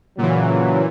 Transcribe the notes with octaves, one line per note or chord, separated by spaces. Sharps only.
A#2 C#3 E3 F#3